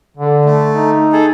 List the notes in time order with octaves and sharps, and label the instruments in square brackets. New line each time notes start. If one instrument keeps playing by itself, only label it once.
[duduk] D3
[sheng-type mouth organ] A3
[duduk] D#4
[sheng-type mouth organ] G#4 A4